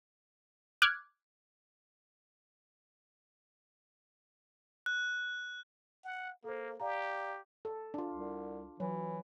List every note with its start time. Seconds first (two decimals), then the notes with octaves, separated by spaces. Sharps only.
0.82 D6 F6 F#6 G#6
4.86 F#6
6.04 F#5
6.44 A#3 A4 C5
6.80 G4 D5 F5 A#5
7.65 A4
7.94 D4 F4
8.14 C2
8.80 E3 F#3